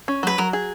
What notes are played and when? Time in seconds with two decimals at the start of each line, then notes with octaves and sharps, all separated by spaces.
0.08 C#4
0.23 F#3 B4
0.38 F#3 A#4
0.53 G#4